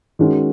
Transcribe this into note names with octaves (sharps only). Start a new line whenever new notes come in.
D#3 G#3 C#4 F#4